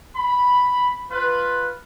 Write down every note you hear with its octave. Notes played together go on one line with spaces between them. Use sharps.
B5
F4 B4